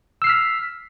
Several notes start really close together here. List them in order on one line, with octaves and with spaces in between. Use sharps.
E6 C7 F6 B6